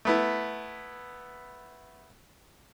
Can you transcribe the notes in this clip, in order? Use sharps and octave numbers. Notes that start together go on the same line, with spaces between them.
A3 B3 E4